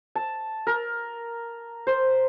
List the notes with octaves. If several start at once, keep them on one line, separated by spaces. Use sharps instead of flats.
A5
A#4
C5